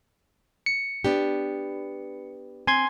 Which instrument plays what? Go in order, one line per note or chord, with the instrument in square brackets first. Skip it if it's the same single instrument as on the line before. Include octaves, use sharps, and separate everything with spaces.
[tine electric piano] C#7
[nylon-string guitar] B3 D4 G4
[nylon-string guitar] C4 [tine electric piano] G#5 C6 G#6